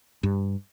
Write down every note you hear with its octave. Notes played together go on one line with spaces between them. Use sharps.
G2